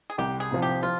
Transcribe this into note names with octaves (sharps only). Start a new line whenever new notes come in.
G#4
C2 G4
G#4
C3 F3
G4
F3 F4